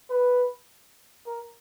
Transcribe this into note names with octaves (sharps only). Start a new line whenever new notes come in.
B4
A#4